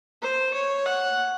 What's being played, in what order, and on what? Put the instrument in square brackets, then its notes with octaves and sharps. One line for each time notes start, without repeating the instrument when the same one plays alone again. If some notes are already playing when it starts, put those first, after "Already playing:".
[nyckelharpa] C5
C#5
F#5